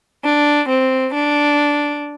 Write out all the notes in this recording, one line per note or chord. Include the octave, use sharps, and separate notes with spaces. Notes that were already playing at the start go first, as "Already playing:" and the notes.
D4
C4
D4